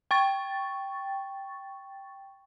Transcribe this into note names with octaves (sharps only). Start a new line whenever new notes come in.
G5 C#6 A6